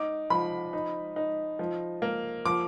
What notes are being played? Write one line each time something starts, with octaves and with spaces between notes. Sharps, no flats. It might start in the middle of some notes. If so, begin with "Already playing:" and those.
Already playing: D#4 D6
F3 B5
D#4
D#4
F3
A#3
F3 D6